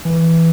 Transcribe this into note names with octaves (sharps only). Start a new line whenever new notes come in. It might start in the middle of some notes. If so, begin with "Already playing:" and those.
E3